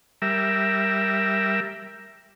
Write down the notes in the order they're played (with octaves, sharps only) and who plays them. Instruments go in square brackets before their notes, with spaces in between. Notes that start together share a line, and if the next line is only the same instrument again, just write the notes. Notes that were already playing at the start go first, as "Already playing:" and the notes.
[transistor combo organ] G3 A#4 E5